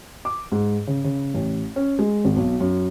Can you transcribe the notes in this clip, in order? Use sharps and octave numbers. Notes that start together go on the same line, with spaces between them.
D6
G#2
C#3
C#3
A1
C#4
G#3
G#1
B1
F#2